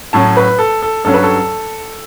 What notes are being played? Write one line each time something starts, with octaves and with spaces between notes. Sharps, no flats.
A2 F#3 C#4 A5
B4
A4
A4
G2 F#3 C#4 A4
B4
A4